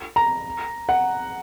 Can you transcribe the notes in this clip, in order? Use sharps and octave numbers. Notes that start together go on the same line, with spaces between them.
A#5
F#5